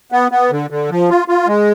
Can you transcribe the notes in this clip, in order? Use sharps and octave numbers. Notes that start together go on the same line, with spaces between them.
B3
B3
D3
D3
F3
F4
F4
G#3